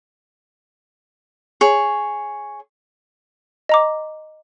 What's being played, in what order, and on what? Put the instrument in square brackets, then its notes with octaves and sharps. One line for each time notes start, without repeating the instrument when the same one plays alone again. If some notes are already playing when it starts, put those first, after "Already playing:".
[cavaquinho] G#4 C#5
[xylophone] D#5 A#5 D6